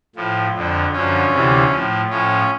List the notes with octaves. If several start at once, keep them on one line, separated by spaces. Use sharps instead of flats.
A2 F3
F2 D3 F3
F#2 D3 F3 C#4
D2 C3 E3
A2 F3
A2 F3 C#4